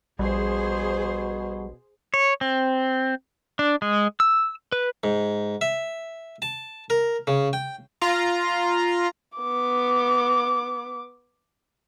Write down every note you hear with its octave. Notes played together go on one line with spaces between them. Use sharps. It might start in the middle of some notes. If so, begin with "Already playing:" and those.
A#1 B2 G3 G#4 C5
C#5
C4
D4
G#3
E6
B4
G#2
E5
A5
A#4
C#3
G5
F4 A#5
B3 D6